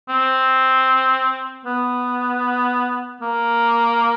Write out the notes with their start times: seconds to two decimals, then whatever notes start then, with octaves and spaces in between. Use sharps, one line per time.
0.09 C4
1.65 B3
3.21 A#3